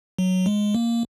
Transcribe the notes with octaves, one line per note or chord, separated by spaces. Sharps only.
F#3
G#3
A#3